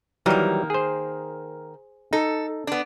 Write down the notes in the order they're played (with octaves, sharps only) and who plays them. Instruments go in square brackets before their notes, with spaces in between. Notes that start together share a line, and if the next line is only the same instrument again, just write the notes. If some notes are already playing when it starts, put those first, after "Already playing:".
[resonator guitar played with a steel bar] D#3 A#3 [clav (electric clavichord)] E3 F#3 G3
[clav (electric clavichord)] G#4 C5
[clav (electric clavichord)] D#4 [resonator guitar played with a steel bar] A4
[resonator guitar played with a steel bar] B3 D4